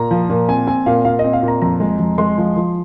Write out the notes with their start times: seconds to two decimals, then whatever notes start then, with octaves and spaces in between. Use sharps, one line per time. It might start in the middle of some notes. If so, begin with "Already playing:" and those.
Already playing: A#2 A#5
0.11 F3
0.30 A#2
0.48 C4 G#5
0.67 C4 G#5
0.86 A#2 F5
1.05 A#2 F5
1.19 D#5
1.24 C4
1.33 F5
1.43 A#2
1.48 A#5
1.62 F2 A#5
1.80 G#3
1.99 F2
2.18 G#3 C6
2.38 F3
2.56 F3